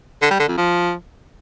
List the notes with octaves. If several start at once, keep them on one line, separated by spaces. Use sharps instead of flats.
D3
G3
D3
F2
F3